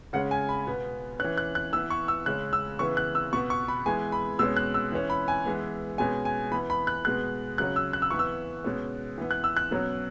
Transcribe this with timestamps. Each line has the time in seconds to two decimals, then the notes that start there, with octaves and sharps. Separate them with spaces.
0.13 C#3 G#3 C#4 F#5
0.31 G#5
0.49 B5
0.67 B2 B3
1.20 C#4 F#6
1.24 E3
1.38 F#6
1.55 F#6
1.73 E3 B3 E6
1.90 C#6
2.08 E6
2.26 C#3 G#3 C#4 F#6
2.53 E6
2.79 C#3 E3 B3 C#6
2.97 F#6
3.15 E6
3.33 B2 B3 C#6
3.50 C#6
3.68 B5
3.86 E3 G#3 B3 G#5
4.12 B5
4.39 B2 G#3 C#4 E6
4.57 F#6
4.74 E6
4.92 E3 C#4
5.10 B5
5.28 G#5
5.45 E3 G#3 B3
5.98 B2 G#3 C#4 G#5
6.25 G#5
6.51 E3 B3 B5
6.70 B5
6.87 F#6
7.05 B2 G#3 B3 F#6
7.58 C#3 F#3 C#4 F#6
7.76 E6
7.93 F#6
8.02 E6
8.11 E3 B3 C#6
8.19 E6
8.64 B2 G#3 C#4
9.18 E3 B3
9.31 F#6
9.44 E6
9.57 F#6
9.71 B2 F#3 C#4